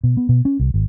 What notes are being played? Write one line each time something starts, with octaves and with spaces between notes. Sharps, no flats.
B2
B3
B2
C#4
C2
G#1